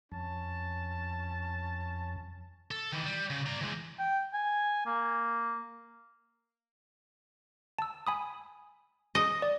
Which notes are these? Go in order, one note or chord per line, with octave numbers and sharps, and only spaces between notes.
F2 C#4 A5
A4
D#3 E3
G3
C#3
D5 A#5
E3 G#3
G5
G#5
A#3
A5 E6
G#5 B5 D#6
D#5
D5